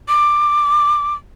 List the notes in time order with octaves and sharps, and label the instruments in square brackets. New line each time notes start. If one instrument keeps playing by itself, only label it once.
[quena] D6